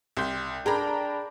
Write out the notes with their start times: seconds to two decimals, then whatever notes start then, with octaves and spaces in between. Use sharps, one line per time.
0.17 C2 C6 G6
0.66 D4 G#4 A#4 G5 A#5 B5